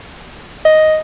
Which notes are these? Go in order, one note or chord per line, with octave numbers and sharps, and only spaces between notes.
D#5